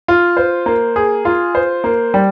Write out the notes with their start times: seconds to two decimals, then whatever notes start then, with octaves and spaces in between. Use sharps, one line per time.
0.08 F4
0.37 C5
0.66 A#3
0.96 G#4
1.25 F4
1.55 C5
1.84 A#3
2.14 G3